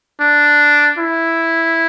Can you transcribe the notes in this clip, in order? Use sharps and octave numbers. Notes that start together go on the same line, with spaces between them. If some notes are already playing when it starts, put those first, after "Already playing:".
D4
E4